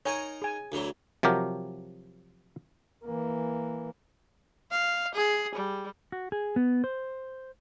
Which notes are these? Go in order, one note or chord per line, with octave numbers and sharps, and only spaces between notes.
D#4 A#4 C#5 G#5
G#4 G#5
D2 E3 F#3
C3 F3 F#3 G4 A#4
E3 A#3
F5
G#4
G3
F#4
G#4
B3
C5